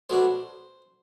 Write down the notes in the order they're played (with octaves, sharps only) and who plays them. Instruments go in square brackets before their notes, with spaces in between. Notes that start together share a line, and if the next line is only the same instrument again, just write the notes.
[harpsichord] B1 B2 F#3 A3 D4 C5